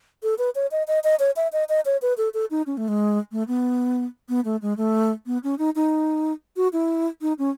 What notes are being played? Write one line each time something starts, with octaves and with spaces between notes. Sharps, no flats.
A4
B4
C#5
D#5
D#5
D#5
C#5
E5
D#5
D#5
C#5
B4
A4
A4
D#4
C#4
A3
G#3
A3
B3
B3
A3
G#3
A3
B3
C#4
D#4
D#4
F#4
E4
D#4
C#4